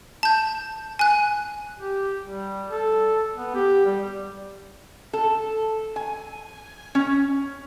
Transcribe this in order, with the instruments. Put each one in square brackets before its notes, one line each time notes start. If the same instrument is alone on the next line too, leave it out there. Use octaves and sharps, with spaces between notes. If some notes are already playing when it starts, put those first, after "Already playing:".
[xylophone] A5 G6
G#5 F#6
[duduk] G4
G3
A4
B3
G4
G3
[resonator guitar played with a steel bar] A4
G#5
C#4